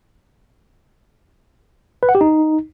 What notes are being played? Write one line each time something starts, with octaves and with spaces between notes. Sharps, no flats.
B4
F#5
G4
D#4